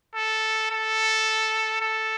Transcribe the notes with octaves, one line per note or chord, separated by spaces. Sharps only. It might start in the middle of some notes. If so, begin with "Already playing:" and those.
A4
A4
A4